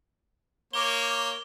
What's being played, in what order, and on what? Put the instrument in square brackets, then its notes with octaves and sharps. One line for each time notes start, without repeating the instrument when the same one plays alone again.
[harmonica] A#3 C#5 [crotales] D6 G7